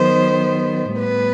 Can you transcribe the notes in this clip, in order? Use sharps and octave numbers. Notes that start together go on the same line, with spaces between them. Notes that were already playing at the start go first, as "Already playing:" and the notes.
Already playing: D#3 F#3 B3 C5
A2 G3 B3 B4